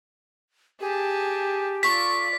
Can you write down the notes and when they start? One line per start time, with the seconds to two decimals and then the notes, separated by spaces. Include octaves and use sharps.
0.80 G4 G#4 A5
1.83 F4 A4 D5 F5 C#6 B6